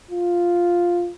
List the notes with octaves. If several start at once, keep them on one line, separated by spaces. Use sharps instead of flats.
F4